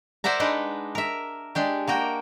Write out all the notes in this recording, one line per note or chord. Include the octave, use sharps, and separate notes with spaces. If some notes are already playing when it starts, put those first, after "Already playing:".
A#4 C5 D5 E5 F#5 A#5
G#3 D4 D#4 B4
A#4 E5
G#3 D4 G4
A#3 F#4 A#4 G5